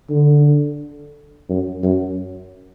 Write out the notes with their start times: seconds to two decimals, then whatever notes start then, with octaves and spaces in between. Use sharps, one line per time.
0.10 D3
1.50 F#2
1.84 F#2